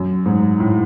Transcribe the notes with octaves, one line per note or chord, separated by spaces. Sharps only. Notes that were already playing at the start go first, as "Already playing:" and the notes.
Already playing: F#2
G#2
A2